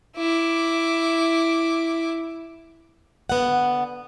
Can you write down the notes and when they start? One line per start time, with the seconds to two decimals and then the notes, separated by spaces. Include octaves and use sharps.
0.16 E4 D6
3.29 D3 B3 F#5